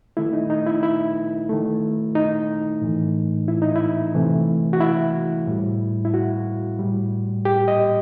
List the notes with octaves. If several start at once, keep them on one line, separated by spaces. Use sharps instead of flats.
D#3 A3 E4
D#4
D#4
E4
E4
D#3 A3
D#4
A2 E3 A3
E4
D#4
E4
C3 E3 A3
F#4
E4
A2 G3
E4
F#4
A2 G3
G4
D#5